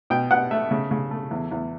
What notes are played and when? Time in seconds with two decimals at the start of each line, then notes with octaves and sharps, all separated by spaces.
0.10 B2 G5
0.31 B2 F#5
0.51 A3 E5
0.71 C#3
0.91 C#3
1.11 A3
1.31 E2
1.52 E2